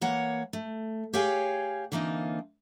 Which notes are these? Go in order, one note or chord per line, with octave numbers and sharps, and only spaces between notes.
E3 A#3 C#5 F#5
A3
G4 G#4 C#5 F5 G5 G#5
D3 E3 A#3 C4 D#4 F4